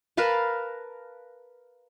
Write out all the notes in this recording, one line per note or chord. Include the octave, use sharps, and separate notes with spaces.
A#4 B4 F5 A5